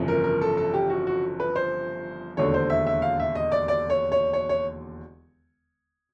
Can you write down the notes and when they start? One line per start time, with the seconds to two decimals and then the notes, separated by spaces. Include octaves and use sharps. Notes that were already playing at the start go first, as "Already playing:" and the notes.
Already playing: G1 F2 C#3 E3
0.08 A#4
0.24 A#4
0.41 A4
0.57 A4
0.74 G4
0.90 F#4
1.07 F#4
1.40 B4
1.56 C5
2.37 E1 D#2 D3 C#5
2.54 C5
2.70 E5
2.87 E5
3.02 F5
3.20 E5
3.35 D#5
3.52 D5
3.68 D5
3.90 C#5
4.12 C#5
4.33 C#5
4.49 C#5